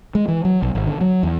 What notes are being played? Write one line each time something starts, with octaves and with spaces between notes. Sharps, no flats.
G#3
E3
F#3
B1
G#1
D3
F#3
E2